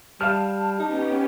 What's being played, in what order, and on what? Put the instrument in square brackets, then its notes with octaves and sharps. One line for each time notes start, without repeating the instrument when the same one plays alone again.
[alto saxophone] G3 [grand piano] F5 F6 [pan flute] A5
[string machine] B3 C#4 G4 [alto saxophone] D#4